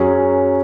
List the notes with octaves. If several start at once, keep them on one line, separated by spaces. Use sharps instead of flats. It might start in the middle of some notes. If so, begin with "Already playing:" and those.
Already playing: F#2 F#3 C#4 G#4